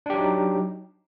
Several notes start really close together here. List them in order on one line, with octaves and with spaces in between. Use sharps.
D4 G4 F#3 D#4